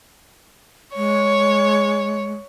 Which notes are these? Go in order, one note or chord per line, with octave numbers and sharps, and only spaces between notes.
G#3 C#5